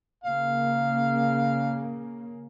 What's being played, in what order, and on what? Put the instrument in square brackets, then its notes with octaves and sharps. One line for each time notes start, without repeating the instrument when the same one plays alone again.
[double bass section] C#3 A#3 [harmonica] F5